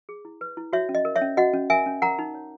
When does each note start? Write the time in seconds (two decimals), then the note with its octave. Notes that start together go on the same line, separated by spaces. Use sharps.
0.09 G#4
0.25 E4
0.41 B4
0.57 E4
0.73 F#4 C#5 E5
0.89 C#4
0.95 D#5
1.05 A#4
1.16 C#5 E5
1.21 C#4
1.37 F#4 D#5 F#5
1.53 C#4
1.70 A#4 E5 G#5
1.86 C#4
2.02 A#4 F#5 A#5
2.19 D#4
2.35 C#5